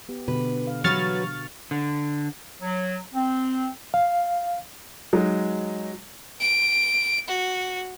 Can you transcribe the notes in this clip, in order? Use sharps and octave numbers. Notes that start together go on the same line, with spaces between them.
B3 G4
B2 D3 F#4 B4
F5
F#3 F#4 B4 C#6 F6 A6
D3
F#3
C4
F5
F#3 G#3 D#4
D7
F#4